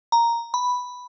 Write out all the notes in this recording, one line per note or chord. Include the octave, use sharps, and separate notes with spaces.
A#5
B5